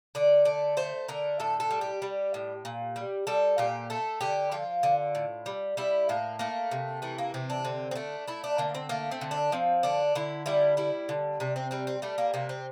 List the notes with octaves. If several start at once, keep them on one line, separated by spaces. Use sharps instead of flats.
D3 D5
A3 D5
A3 C5
D3 A#4
A2 A4
A4
G3
G4
G3
A2
A#2
G3
G3 A4
A#2 G4
A3 A4
D3 G4
F3 F4
D3
A2
G3
G3 E4
A2 A#3
A3 A#3
C3
E3 A3
A#3
C3 C4
D4
D3 C4
C4
A3 D4
A3 E4
D4
D3 A#3
C4
A3 A#3
C4
D3
D4
F3 C4
D3 D4
D3 E4
G3 E4
G3 E4
D3
C3 D4
C4
G3 C4
C4
G3 A3
A#3
C3 A#3
C4